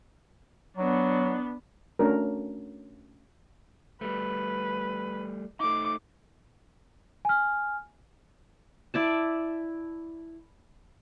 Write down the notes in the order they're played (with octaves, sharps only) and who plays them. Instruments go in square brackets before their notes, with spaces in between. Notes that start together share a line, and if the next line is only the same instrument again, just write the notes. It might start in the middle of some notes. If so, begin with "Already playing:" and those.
[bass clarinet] F#3 [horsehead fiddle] B3 D4
[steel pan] A3 C#4 D4 F#4 A#4
[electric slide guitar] G3 A3 [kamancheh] B4
[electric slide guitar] A3 D#4 [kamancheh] D6
[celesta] G#5 F6
[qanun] E4 D5 A5